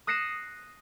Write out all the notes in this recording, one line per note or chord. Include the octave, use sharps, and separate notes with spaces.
D#6 F#6 A#6 C7 C#7 E7